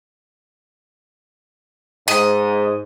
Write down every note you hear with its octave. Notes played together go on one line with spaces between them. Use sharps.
G#2 D#5